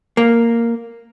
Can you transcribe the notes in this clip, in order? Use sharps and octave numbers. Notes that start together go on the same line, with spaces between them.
A#3